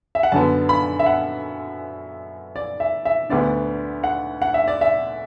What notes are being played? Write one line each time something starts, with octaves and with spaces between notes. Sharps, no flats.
E5
F#5
F#2 D3 B3 A5
B5
E5
F#5
D5
E5
E5
D2 D3 B3 D4 D5
F#5
F#5
E5
D5
E5